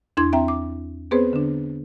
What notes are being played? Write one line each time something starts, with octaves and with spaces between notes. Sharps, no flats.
E2 D4 E4 C6 G#6
C4 E5 G5 A#5
D6
B3 C4 G#4 B4 C5
D3 D4